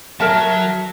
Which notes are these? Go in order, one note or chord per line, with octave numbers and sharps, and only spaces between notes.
F#3 A#4 E5 A5